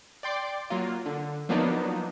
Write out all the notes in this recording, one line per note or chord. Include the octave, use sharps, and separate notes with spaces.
D5 G5 C6 D6
F#3 A#3 F4
D3
F3 F#3 A#3 B3 D4 D#4